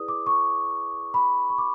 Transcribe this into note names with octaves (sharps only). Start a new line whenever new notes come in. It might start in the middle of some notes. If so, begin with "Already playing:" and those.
Already playing: E4 G#4 B4 D5 D#6
D6
C#6
B5
C#6
D6